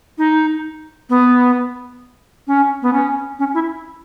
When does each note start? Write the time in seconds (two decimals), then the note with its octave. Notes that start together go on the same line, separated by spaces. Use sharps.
0.18 D#4
1.10 B3
2.47 C#4
2.82 B3
2.93 C#4
3.39 C#4
3.54 E4